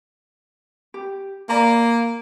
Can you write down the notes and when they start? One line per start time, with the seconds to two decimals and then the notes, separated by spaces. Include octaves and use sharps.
0.94 G4
1.49 A#3 D5 A#5 B5